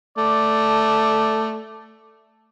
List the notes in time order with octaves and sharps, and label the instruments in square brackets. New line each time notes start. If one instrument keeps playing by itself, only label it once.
[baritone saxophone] A3 [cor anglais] D5